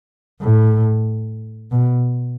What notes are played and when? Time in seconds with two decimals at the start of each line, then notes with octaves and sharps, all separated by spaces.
0.42 A2
1.71 B2